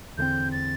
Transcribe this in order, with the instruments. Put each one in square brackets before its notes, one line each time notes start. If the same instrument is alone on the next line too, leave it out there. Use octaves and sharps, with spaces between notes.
[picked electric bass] E2 D3 A3 C4 [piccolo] G6
[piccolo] A6